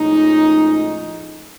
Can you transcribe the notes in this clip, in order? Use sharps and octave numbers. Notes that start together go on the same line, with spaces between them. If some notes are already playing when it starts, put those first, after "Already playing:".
Already playing: A2 F3 G#3 C#4 D#4